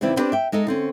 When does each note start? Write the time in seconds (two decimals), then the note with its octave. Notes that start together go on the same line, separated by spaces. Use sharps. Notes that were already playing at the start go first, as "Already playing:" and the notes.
0.01 D#2 C#3 E3 C4 E4 D5
0.16 B3 C4 D4 G4 B4
0.32 E5 G5
0.52 G#3 D#4 A4 D#5
0.67 D3 C4 C#4